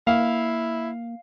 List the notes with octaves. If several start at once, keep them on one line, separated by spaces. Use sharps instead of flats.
A#3 E4 F5